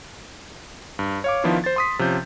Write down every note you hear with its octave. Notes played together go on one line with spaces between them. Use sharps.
G2
C#5 F5 D6
D#3 F3 B3 D4 E4 F4
C5 A6
C6 D#6 B6
C3 F3 C#4 G6